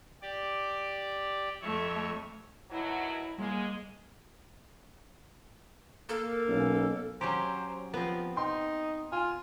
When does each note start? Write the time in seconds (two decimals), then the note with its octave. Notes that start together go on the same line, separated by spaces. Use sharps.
0.22 G4 D5
1.62 F2 A3 C#5 E5
2.71 B2 D#3 F#3 E4
3.39 G3 G#3 A#3
6.09 A#3 A4
6.49 B1 C#4
7.21 F#3 C#4 G4 C5 A#5
7.94 F3 B3 C4
8.37 D#4 G5 C6
9.12 F4 G#5